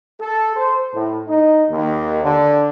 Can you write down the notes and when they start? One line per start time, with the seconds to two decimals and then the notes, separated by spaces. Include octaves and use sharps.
0.19 A4
0.55 C5
0.93 A2
1.27 D#4
1.70 D#2
2.23 D3